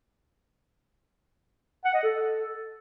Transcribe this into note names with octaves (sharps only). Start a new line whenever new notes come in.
F#5
D#5
A4